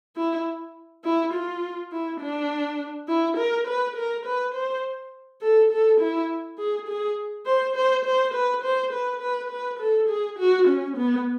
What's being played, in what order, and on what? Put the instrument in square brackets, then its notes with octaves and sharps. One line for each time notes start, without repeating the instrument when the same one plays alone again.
[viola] E4
E4
F4
E4
D4
E4
A#4
B4
A#4
B4
C5
A4
A4
E4
G#4
G#4
C5
C5
C5
B4
C5
B4
B4
B4
A4
G#4
F#4
C#4
B3